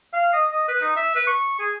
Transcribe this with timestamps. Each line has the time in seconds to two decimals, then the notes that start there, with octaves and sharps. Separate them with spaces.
0.13 F5
0.33 D#5
0.51 D#5
0.68 B4
0.81 D#4
0.96 E5
1.15 B4
1.27 C#6
1.59 G#4